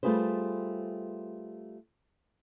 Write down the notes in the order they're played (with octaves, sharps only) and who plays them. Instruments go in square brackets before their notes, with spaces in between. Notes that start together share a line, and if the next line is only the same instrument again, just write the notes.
[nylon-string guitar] G3 A3 F4 G#4 B4 C5